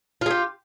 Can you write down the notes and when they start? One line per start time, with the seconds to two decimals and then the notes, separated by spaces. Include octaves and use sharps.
0.21 F4
0.26 G#4
0.30 G4